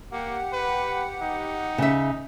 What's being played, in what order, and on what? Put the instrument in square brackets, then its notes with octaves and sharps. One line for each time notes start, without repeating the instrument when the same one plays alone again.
[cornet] A#3 [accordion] G4 F#5
[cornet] B4
D#4
[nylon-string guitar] C#3 E5